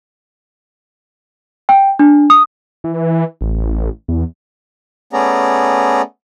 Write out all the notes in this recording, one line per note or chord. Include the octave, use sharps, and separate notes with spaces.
G5
D4
D#6
E3
A1
E2
A3 B3 C#4 G#4 D5 A#5